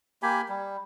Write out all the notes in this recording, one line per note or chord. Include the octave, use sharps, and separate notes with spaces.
A#3 G4 G#5 B5
G3